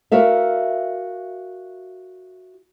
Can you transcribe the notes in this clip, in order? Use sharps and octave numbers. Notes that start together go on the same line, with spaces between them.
F#4 A#4 E5 F5